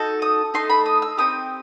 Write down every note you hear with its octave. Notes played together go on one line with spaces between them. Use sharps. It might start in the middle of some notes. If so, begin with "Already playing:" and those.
Already playing: D#4 F#4 A4
D#6
A3 D#4 A4 C6
B5
D#6
E6
C4 D#4 G4 D#6